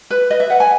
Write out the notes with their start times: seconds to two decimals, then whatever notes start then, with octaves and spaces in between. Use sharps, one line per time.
0.11 B4
0.30 B4 D#5
0.40 E5
0.50 B4 F#5
0.60 G#5